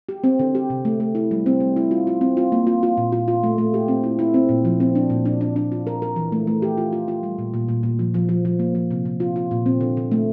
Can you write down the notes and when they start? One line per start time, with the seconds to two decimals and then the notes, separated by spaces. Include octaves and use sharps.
0.09 G4
0.24 C4
0.39 D3
0.55 G4
0.70 C3
0.85 A3
1.00 A3
1.15 E4
1.31 G3
1.46 C4
1.60 G3
1.76 E4
1.91 F4
2.07 F4
2.21 C4
2.37 F4
2.52 A#3
2.67 F4
2.83 F4
2.97 A#2
3.12 F4
3.28 F4
3.43 A3
3.58 A3
3.74 G4
3.88 C4
4.03 E4
4.19 E4
4.34 C4
4.49 A#2
4.65 F3
4.80 C4
4.95 D4
5.10 A#2
5.26 D4
5.41 D4
5.56 D4
5.72 F4
5.87 A#4
6.02 A#4
6.16 E3
6.32 A3
6.47 A3
6.62 G4
6.78 F4
6.93 F4
7.08 F4
7.23 G3
7.38 A#2
7.54 A#2
7.69 A#2
7.83 A#2
7.99 F3
8.14 F3
8.29 F3
8.45 F3
8.59 A#3
8.75 F3
8.91 C3
9.05 C3
9.20 F4
9.36 F4
9.51 A#2
9.66 C4
9.81 D3
9.97 D3
10.11 A3